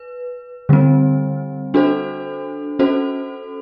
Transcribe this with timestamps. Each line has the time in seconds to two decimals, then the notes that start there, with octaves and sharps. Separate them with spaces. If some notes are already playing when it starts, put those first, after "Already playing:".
Already playing: B4
0.69 D3 G3 C4
1.74 D4 F#4 A4 C5
2.79 C#4 F#4 A4 C5